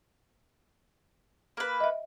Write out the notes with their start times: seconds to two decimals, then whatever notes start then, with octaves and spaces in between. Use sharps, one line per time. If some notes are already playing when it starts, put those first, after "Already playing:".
1.57 A#3 B4
1.80 D#5 E5